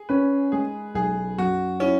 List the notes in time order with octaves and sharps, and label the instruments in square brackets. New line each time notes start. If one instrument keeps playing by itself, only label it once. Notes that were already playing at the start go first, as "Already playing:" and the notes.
Already playing: [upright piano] G#4
[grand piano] C#4 [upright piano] B4
[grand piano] G#3 [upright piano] G#4
[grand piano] B1 [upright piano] G#4
[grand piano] F#2 [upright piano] F#4
[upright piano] C#4 [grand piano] E4